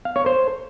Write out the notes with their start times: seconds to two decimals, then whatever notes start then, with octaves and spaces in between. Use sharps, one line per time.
0.05 F5
0.16 C#5
0.26 C5